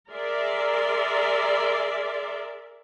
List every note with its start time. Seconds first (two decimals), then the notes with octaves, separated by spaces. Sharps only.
0.12 G#4 A#4 D5 E5 C6